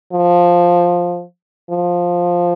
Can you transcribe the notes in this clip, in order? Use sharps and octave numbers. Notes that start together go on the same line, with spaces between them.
F3
F3